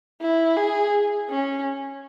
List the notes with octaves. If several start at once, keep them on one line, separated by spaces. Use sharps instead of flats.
E4
G#4
C#4